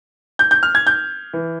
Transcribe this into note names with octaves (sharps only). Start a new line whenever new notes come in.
G6
G6
F6
G#6
G6
E3